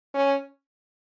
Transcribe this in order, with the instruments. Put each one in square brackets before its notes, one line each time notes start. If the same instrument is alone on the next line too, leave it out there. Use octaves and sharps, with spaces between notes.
[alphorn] C#4